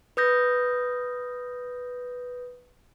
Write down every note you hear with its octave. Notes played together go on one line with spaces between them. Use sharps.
B4 D#6 G6 A#6